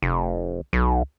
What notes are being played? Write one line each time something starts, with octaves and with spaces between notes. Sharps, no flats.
F1
B1